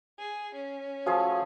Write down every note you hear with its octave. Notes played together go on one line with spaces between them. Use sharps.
G#4
C#4
F3 A3 F#4 G#4 C5 F5